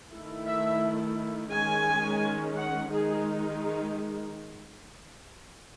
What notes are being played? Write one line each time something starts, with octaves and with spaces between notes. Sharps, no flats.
D#3 A3 E4
E5
D#3 G#3 C#4 G#5
F#5
D#3 G#3 D#4 G#4